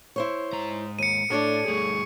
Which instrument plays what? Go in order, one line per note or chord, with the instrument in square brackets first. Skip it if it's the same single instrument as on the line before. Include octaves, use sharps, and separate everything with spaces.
[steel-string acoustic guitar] E4 C5 C#5
[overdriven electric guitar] G#2 A#5
[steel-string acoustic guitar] D#2 [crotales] C#7 D#7
[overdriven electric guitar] A2 [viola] D4 [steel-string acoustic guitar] A4 C#5 D5
[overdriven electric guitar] G2 A3 [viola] G#4 C#6